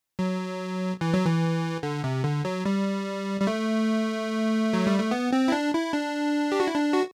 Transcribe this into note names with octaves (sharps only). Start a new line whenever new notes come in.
F#3
E3
F#3
E3
D3
C3
D3
F#3
G3
G3
A3
F#3
G3
A3
B3
C4
E4
D4
E4
D4
G4
F#4
E4
D4
F#4